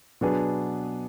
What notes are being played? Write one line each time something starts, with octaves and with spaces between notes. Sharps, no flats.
B2 F#3 B3 D4 G#4